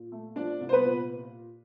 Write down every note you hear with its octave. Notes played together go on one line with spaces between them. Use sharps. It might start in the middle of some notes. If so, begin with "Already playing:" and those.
Already playing: A#2
A3
F3 D4 D5
C2
C5
B3 B4
A#2